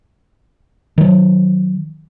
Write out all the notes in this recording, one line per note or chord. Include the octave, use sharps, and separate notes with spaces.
D#3 F#3